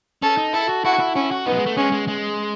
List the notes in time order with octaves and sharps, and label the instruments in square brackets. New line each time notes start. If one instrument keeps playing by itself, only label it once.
[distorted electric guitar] C#4 [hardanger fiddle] A4
[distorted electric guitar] D#4
[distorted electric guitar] E4 [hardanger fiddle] A4
[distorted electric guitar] F#4
[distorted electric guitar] E4 [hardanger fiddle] F#4
[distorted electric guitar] E4
[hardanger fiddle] C#4 [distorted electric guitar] E4
[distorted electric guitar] F#4
[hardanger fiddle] B3 [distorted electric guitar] D#4
[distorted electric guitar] F#3
G#3
A3
[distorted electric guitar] G#3 [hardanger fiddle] C#4
[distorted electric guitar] G#3
G#3